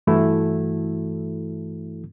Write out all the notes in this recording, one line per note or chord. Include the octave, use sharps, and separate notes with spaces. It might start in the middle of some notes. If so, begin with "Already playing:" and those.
G2 E3 A3 E4 F#4 A4